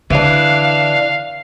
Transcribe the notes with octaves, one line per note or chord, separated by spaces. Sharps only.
D3 E3 D4 F5